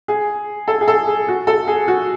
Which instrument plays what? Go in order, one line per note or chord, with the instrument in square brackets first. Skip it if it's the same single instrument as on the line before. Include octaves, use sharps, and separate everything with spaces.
[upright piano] G#4
A4
G#4
A4
G#4
F#4
A4
G#4
F#4